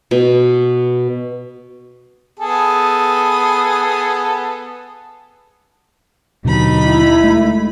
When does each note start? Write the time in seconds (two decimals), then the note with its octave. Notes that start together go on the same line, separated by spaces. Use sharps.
0.11 B2
2.39 B3 G#4 A4
6.45 D#2 B2 D3 F#3 D#4 B5
6.84 E4
7.24 G#3 A3